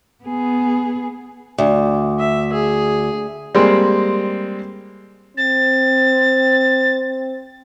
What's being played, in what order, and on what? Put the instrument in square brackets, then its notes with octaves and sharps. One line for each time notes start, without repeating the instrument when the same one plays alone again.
[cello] B3 G#4
[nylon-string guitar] D2
[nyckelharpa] E5
G#4
[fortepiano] G3 G#3 A#3 C4
[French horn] C4 [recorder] A6